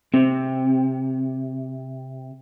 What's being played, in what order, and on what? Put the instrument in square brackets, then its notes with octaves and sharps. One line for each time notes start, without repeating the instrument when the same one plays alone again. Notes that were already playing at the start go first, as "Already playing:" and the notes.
[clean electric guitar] C3 [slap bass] C4